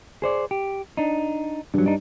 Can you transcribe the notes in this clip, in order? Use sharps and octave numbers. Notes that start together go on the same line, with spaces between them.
G#4 C5 D5
G4
D4 D#4
G2 D3 F#3
D4 D#4